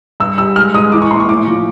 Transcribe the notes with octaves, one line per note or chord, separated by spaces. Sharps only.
G2 E6
G3 E6
G#3 F6
G#3 D#6
E3 D6
C#6
A#1 C6
C#6
A2 D6
F3